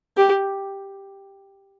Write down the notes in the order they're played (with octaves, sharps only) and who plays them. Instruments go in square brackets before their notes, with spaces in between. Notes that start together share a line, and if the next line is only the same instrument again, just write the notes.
[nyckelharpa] G4